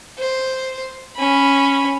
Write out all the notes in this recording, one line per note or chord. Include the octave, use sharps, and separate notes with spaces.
C5
C#4 B5